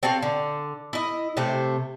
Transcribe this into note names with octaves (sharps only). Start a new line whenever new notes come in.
C4 F#4 A4 F5
D3
E4 D#5
C3 A3 C5